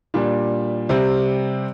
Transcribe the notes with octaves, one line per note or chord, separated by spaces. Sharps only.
A#2 G3 D4
C3 G3 C4 G4